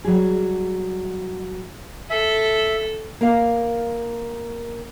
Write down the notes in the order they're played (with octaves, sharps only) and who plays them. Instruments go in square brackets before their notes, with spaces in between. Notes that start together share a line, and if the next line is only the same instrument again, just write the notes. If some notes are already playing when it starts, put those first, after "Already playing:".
[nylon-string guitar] F#3 G3 G#4
[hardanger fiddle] A4 [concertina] E5
[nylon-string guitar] A#3 A#4 F5